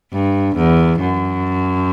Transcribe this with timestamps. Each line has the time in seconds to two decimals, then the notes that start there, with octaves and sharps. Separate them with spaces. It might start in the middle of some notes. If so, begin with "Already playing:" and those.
0.12 G2
0.56 E2
1.01 F#2